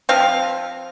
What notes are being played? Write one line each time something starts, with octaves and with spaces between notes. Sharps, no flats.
F3 C4 F5